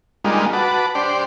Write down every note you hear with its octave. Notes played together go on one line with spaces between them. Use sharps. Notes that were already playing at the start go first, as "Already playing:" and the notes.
G3 G#3 A#3 D4 D#4 F4
F#4 B4 A5 D6
D4 G4 C5 D5